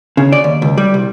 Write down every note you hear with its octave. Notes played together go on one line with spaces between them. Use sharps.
C#3
D5
D#2
C#2
G3
C2